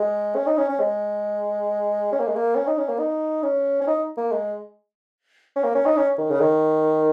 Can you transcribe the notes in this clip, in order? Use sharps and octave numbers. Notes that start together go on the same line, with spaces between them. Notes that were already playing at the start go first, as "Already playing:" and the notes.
Already playing: G#3
C#4
D#4
C#4
C#4
G#3
C#4
A#3
G#3
A#3
C#4
D#4
C#4
A#3
D#4
C#4
C#4
D#4
A#3
G#3
C#4
A#3
C#4
D#4
C#4
D#3
C#3
D#3